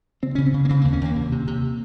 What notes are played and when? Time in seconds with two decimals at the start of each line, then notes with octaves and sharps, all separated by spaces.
0.23 C#3 C4
0.35 C#3 C#4
0.46 C4
0.54 C#3
0.65 A#3
0.69 C#3 C4
0.81 A#3
0.85 D#2
0.93 C#4
1.01 D#2 A#3
1.16 C3
1.32 C3
1.47 C3